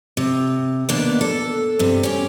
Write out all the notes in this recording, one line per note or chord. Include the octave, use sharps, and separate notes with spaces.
C3
D#2 B2 A#3 B3 D4 D5
A4
G2 C3
C#4 G4